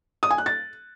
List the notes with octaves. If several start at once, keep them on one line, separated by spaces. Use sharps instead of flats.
D#6
G#5
F#6
A6